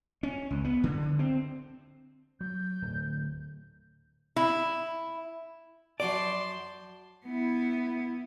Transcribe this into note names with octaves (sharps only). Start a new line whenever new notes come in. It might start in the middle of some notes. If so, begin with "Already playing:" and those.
C#4
C#2
B3
D3
C4
F#3 G6
D1
E4
F#2 F#4 D5 A5 C6 D6 G6
B3 E4